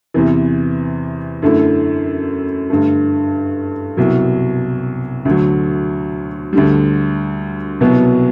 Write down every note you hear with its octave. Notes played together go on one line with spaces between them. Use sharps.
E2 C3 E3
F#2 D3 A3 E4
G2 D3 A3
C2 B2 F#3
D2 D3 F#3
D2 D3 G3
C2 B2 F#3 B3